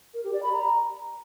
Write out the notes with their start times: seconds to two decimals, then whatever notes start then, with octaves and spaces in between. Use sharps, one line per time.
0.14 A#4
0.24 G4
0.33 D5
0.43 B5
0.52 A#5